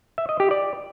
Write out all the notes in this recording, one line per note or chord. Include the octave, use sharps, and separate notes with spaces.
E5
D#5
G4
D5